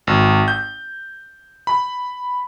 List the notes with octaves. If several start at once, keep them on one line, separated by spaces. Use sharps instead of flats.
G#1
G6
B5